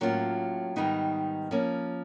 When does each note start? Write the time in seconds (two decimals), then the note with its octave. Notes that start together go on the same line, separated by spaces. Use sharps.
0.01 A2 F#3 A#3 C#4 F4
0.76 G#2 D#3 G3 B3 D#4
1.51 F3 A#3 C#4